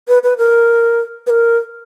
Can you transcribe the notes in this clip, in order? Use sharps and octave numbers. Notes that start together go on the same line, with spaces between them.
B4
B4
A#4
B4
A#4